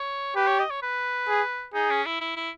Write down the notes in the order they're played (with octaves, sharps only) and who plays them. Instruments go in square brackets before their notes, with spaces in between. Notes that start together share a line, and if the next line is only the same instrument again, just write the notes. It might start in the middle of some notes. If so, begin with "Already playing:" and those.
Already playing: [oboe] C#5
[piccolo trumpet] G4 [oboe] B4
[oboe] C#5
D#5
C#5
B4
[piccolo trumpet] G#4
[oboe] D#4 [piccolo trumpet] G#4
[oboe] C#4
E4
E4
E4